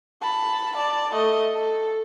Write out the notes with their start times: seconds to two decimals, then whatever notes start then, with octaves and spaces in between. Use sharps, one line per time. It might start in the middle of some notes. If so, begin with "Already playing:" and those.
0.22 A5 B5
0.76 D5 A5
1.14 A3 D#5
1.54 A4